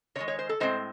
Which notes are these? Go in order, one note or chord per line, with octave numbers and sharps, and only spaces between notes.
C3 C#5
D#3 G#3
C#5
C5
A4
A2 G#3 C4 C5